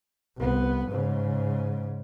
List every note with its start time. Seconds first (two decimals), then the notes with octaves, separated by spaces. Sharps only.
0.37 C2 B3
0.88 G#2 C#3